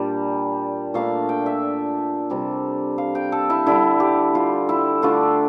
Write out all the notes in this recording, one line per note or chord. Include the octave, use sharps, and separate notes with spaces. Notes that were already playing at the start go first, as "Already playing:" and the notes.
Already playing: A#2 G3 D4
A#2 A3 D4 F5
G5
E5
C3 G3 D4
F5
G5
A4
E4
D3 G3 D4 E4
G4
F4
E4
D3 A3 D4 F4